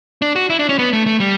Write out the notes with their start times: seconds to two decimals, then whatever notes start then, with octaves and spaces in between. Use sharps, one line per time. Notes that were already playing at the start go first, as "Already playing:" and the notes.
0.22 D4
0.36 F#4
0.50 E4
0.59 D4
0.69 C#4
0.79 B3
0.93 A3
1.06 A3
1.20 G3